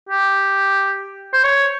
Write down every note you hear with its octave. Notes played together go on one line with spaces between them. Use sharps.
G4
C5
C#5